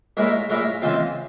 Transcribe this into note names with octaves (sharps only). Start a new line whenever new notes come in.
A#2 G#3 E4 A#4 C#5
A#2 G#3 E4 A#4 C#5
C#3 E3 G#3 C4 F4